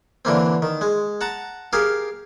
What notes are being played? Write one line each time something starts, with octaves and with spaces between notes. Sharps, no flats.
D3 E3 A#3 C4
D#3
G#3
F#5 A5 A#5
G4 G#4 A#4 F5